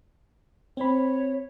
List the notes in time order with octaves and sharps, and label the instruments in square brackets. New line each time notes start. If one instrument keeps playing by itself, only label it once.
[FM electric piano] C4 B5 [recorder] C#5